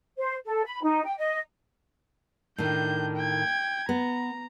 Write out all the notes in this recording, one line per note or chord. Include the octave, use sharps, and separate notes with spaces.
C5
A4
B5
D#4
G5
D#5
A2 D#3 D4 G6
G5 G#6
B3 A#5